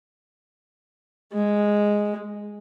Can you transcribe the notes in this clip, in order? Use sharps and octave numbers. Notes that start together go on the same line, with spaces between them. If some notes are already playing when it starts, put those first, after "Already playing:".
G#3